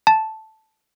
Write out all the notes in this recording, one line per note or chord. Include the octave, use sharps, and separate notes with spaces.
A5